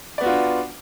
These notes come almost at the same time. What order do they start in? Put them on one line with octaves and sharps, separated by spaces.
D5 B3 F#4 F4 D4